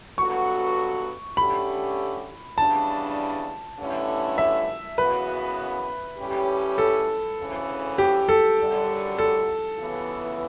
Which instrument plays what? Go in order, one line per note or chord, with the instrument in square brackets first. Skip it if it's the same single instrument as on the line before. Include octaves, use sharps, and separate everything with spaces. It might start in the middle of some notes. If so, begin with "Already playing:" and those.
[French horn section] G2 F#3 B3 F#4 A4 [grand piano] C#6
[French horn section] D3 A3 C#4 G4 [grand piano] B5
[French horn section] E2 C#3 G3 D4 [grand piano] A5
[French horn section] G2 D3 A3 C#4 E4
[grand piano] E5
[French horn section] F#2 C#3 E3 B3 F#4 [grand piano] B4
[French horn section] A2 G3 C#4 G4
[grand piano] A4
[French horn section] D2 C#3 E3 A3 C#4
[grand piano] G4
A4
[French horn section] F#2 D3 G3
[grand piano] A4
[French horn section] C#3 E3 B3